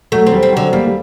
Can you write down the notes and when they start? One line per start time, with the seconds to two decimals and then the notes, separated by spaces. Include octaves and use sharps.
0.12 F#3 A3
0.27 C4
0.32 G3
0.43 C4
0.53 D3 F#3
0.72 G3 A#3
0.86 G3